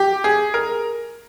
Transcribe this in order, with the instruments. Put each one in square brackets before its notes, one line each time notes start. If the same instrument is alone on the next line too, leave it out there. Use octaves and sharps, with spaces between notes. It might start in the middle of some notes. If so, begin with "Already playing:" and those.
Already playing: [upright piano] G4
G#4
A#4